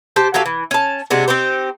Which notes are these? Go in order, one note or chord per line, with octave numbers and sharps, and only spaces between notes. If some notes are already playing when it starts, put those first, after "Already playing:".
G4 C5 A5
F#3 G4 A4 F5
E3
C#4 A5
C3 G#3 D4 F#4
C4 D#4 G4 C5